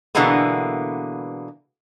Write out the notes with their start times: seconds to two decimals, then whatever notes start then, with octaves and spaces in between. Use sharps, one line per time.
0.15 B2 D3 E3 G#3 A#3 B3